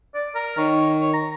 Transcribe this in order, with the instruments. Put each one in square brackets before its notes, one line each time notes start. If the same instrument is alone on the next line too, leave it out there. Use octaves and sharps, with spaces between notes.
[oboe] D5
A#4
[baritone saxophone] D#3 [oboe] C#5
[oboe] C#5
A#5